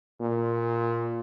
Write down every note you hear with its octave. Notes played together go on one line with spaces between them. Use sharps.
A#2